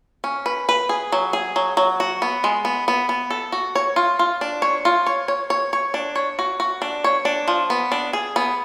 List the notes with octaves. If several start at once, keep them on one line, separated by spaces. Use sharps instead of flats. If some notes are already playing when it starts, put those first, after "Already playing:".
C#4
B4
B4
G#4
F#3
G#4
F#3
F#3
F#4
B3
G#3
B3
B3
B3
A4
F#4
C#5
F4
F4
D4
C#5
F4
C#5
C#5
C#5
C#5
D4
C#5
F#4
F#4
D4
C#5
D4
F3
B3
D4
G#4
B3